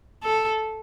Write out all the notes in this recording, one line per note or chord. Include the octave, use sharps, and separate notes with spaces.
A4